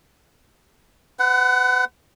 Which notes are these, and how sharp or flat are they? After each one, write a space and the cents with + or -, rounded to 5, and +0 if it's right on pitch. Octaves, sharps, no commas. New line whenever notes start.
B4 +40 F#5 +10